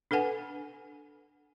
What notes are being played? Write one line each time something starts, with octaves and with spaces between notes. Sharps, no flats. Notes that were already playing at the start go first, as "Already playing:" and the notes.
D4 A4 B4 F#5 G#5